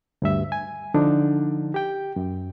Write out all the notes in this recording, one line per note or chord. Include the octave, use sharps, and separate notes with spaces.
D2 G2 E5
G#5
D3 F3 D4 D#4
G4 G5
F#2